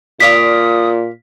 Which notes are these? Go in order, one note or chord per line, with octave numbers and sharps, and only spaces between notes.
A#2 F4 D5 F5 D#6 B6